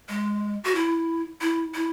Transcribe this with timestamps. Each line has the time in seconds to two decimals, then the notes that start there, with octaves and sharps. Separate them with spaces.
0.09 G#3
0.64 F#4
0.75 E4
1.41 E4
1.74 E4